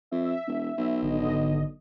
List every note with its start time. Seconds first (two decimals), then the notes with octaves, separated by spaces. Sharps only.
0.12 F2 E5
0.47 E1
0.77 B1
1.02 G#1 D3 D#5